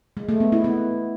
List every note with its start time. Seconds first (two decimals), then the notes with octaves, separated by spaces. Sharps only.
0.17 G#3
0.29 A3
0.40 B3
0.52 E4
0.64 B3